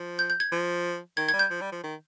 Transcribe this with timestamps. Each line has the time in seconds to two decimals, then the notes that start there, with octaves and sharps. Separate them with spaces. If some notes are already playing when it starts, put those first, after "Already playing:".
Already playing: F3
0.19 G6
0.30 G6
0.40 G#6
0.52 F3
1.17 D#3 G#6
1.29 G3 G#6
1.39 G6
1.51 F3
1.61 G3
1.72 F3
1.83 D#3